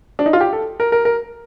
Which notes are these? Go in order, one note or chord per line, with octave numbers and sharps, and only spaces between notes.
D4
D#4
F4
G4
A4
A#4
A#4
A#4